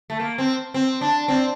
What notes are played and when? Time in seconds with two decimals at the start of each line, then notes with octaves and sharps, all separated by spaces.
0.10 A3
0.20 A#3
0.38 C4
0.74 C4
1.01 D4
1.28 C4